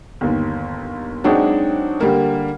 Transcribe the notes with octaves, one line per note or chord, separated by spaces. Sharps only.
G1 D#2
F#3 G#3 C4 D4 D#4 F#4
D3 G3 A#3